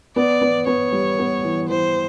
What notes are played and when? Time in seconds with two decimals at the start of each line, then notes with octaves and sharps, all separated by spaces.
0.16 B3 D5
0.42 B3
0.67 B3 C#5
0.92 G3
1.19 B3
1.43 E3
1.69 E3 C5